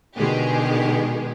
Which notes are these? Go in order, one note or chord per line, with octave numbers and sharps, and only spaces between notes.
B2 D3 D#3 G#3 G4 G#4